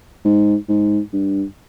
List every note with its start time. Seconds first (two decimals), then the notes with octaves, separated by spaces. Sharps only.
0.25 G#2
0.69 G#2
1.13 G2